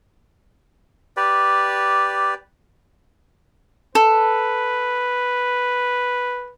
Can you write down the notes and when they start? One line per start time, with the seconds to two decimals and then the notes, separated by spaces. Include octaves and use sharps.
1.17 G4 B4 D5
3.95 A4 B4